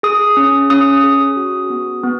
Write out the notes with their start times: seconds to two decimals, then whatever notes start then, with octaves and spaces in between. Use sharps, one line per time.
0.03 G#4 D#6
0.37 C#4
0.70 C#4 D#6
1.04 G#4
1.37 F#4
1.70 B3
2.04 B3